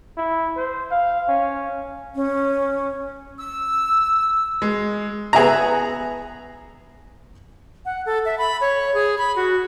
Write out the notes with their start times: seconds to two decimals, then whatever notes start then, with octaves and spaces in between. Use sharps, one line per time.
0.17 E4
0.57 C5
0.91 F5
1.29 C#4
2.16 C#4
3.40 E6
4.62 G#3
5.33 B3 G#4 E5 A#5
7.85 F#5
8.06 A4
8.25 E5
8.38 B5
8.61 C#5
8.94 G#4
9.18 B5
9.36 F#4